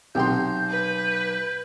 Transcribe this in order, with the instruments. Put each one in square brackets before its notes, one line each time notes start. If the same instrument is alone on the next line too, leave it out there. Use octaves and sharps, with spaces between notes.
[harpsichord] B1 [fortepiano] C3 G5 C6 [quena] G6
[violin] B4